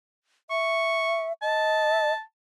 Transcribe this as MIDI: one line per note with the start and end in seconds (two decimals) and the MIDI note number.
0.50 1.33 76
0.50 1.28 85
1.42 2.13 75
1.42 2.20 81